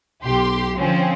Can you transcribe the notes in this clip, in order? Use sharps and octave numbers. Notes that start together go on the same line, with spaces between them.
B1 G4 C6
D3 F3 C4 C#4